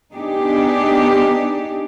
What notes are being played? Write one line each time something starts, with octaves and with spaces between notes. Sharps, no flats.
B3 D4 D#4 G4 G#4